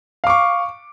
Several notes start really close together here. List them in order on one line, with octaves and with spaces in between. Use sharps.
F5 D6 C#6